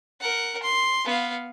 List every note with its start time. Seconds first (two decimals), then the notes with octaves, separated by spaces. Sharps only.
0.21 A#4 F#5
0.63 C6
1.05 B3 F5